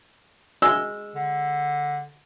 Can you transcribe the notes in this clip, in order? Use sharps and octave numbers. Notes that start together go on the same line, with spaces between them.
G#3 E6
D3